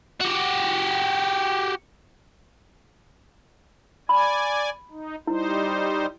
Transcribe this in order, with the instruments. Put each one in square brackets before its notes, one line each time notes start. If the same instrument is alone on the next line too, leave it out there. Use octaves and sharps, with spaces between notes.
[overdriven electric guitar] F#4 G4
[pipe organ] D5 G#5 [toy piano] B5
[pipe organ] D#4
[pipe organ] G3 D#4 C5 [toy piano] E4